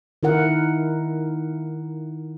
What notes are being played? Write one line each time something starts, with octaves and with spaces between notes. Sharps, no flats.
D#3 E4 A#4 F#5